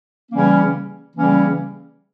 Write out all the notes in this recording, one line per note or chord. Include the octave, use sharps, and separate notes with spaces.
C#3 E3 G3 A#3 C#4
C#3 E3 G3 A#3 C#4